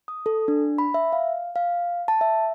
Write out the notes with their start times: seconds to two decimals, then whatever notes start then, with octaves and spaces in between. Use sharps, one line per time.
0.08 D#6
0.26 A4
0.48 D4
0.78 B5
0.94 E5
1.13 F5
1.56 F5
2.08 A5
2.21 E5